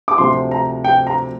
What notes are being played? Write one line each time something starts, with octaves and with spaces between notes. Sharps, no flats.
D6
D2 C3 F3 C6
A#5
G5
A#5